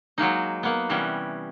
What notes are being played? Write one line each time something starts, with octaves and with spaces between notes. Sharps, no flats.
F#3 G#3 A#3 D#4
A#3 B3
C3 E3 G3 B3 C#4